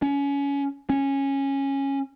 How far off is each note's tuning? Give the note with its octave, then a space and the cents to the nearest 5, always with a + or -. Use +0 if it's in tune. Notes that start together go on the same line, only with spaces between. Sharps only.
C#4 +25
C#4 -10